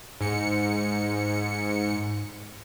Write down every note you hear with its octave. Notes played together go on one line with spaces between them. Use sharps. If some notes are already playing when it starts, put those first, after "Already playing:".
G#2 C#7